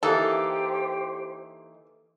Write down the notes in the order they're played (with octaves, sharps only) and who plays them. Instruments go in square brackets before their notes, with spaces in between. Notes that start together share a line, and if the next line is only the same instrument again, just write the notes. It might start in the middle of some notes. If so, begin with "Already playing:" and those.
[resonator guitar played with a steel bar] E3 A#3 D#4 [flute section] G4 C5 [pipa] A4